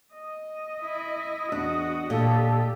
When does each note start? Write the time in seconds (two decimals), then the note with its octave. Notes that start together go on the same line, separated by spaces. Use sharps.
0.14 D#5
0.81 E4
1.52 E2 D4 F#4
2.10 A#2 G4 A4